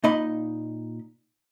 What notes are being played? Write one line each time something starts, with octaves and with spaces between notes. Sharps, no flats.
A#2 D#4 D#5 B5